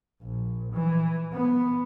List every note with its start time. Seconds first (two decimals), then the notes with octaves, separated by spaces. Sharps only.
0.22 A#1
0.73 E3
1.33 B3